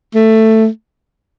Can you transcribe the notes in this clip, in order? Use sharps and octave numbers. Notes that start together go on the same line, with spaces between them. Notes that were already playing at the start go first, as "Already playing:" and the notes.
A3